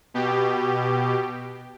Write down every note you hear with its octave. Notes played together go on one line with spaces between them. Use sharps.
B2 G4